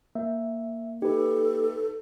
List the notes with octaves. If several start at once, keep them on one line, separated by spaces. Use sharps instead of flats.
A#3 E5
D#4 G4 A4 B4